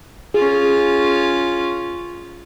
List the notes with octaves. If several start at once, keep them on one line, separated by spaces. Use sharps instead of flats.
C#4 F4 G#4